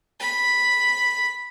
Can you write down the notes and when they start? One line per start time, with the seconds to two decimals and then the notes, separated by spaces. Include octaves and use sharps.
0.20 B5